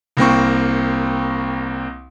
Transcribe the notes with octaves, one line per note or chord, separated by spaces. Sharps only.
C2 A#3 C4 C#6